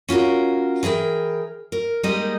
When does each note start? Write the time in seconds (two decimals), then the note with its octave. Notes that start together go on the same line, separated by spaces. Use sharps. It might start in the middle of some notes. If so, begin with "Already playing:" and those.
0.09 C#4 F4 F#4 A#4
0.83 E3 G#4 A#4 G5
1.72 A#4
2.03 G3 G#3 A#3 D#4 G#4 D#5